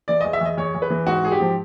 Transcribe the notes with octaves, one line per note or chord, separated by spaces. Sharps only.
E3 D5
E2 D#5
E5
E2 D#5
E2 C#5
E2
B4
E3
G#2 F#4
G#2 G#4
G4
F3